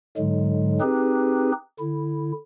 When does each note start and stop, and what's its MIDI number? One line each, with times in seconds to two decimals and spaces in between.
0.17 0.79 44
0.17 0.79 50
0.17 0.79 54
0.17 0.79 56
0.81 1.52 60
0.81 1.52 63
0.81 1.52 67
0.81 1.52 68
0.81 1.52 71
1.80 2.32 50
1.80 2.32 64